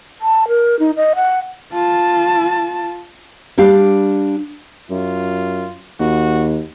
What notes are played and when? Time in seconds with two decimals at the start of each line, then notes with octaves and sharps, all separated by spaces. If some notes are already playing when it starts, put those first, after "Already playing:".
0.21 A5
0.48 A#4
0.79 D#4
0.97 D#5
1.16 F#5
1.72 F4 A5
3.58 G3 D4 G4 F5
4.90 F#2 F4
6.00 D#2 F#4